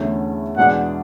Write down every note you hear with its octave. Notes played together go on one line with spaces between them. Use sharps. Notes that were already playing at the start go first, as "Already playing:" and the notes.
Already playing: E2 D3 A3 C#4
E2 B2 G#3 D4 G#4 F#5